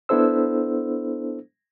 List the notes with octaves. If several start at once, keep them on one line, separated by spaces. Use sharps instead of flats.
B3 D4 E4 A4 C5 E6